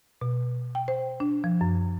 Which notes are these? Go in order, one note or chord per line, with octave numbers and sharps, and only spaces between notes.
B2
G5
C5
D4
F3
F#2